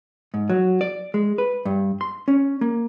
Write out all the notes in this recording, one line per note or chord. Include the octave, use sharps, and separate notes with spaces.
G#2
F#3
D5
G#3
B4
G2
C6
C#4
A#3